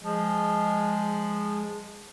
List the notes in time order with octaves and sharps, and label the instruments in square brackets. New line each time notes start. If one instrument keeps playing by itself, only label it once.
[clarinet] F3 [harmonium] G#3